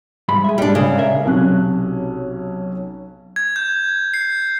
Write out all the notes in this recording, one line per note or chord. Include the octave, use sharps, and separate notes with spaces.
G#2 G3 B5
G#4 E5
G#2 G3 D4 D5
C#3
A#4 D5 E5
B1 C3 C#4 F#6
G#6
G6
C7